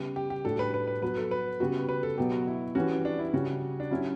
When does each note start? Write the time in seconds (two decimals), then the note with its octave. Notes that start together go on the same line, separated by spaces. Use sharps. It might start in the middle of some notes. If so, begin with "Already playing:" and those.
Already playing: C#3 G3 B3
0.16 G4
0.30 G4
0.44 A2 G3 D4 F#4 A4
0.59 B4
0.74 B4
0.87 B4
1.02 F#3 B3 F#4 B4
1.17 A4
1.31 B4
1.60 C#3 G3 B3 F#4
1.89 B4
2.03 A4
2.18 B2 F#3 B3 G4
2.32 F#4
2.47 E4
2.75 E3 G3 C#4 F#4
3.05 D4
3.19 E4
3.33 C#3 G3 C#4 F#4
3.80 D4
3.90 F#3 C#4 E4 G4